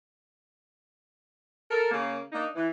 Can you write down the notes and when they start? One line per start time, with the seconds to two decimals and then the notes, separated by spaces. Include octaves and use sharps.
1.71 A4 A#4
1.92 C#3 A#3
2.32 A#3 D4 D#4
2.55 E3